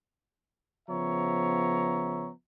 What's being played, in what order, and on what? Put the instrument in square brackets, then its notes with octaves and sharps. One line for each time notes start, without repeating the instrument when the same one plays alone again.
[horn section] C#3 F3 B3 C#5 E5 A#5